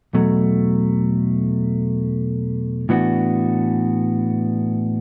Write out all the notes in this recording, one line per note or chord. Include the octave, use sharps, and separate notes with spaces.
E2 B2 F#3 A3
A2 E3 B3 D4 F#4